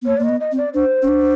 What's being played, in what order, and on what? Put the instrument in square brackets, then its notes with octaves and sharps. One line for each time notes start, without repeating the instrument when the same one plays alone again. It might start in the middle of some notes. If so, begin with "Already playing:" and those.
[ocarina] B3
[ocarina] A#3 [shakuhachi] C#5
[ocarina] A#3 [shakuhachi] D5
[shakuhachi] D#5
[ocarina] B3
[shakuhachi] D#5
[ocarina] C4
[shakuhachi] D5
[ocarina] D4 [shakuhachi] C5
[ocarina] C#4
D4